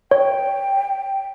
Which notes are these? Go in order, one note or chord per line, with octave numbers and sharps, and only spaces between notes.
C#5 G5